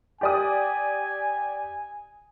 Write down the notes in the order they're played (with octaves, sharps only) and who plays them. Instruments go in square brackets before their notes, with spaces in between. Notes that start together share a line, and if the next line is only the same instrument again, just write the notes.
[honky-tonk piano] G4 D5 D#6 [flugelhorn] G#5